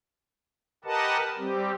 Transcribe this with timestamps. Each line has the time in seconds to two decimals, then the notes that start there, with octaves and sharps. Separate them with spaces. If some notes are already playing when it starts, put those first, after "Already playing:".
0.84 G4 A#4 B4 D#5 F#5 A5
1.37 G3 C4 G4